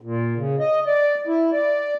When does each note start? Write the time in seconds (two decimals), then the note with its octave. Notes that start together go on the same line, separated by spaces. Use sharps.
0.01 A#2
0.37 C#3
0.59 D#5
0.86 D5
1.27 E4
1.52 D5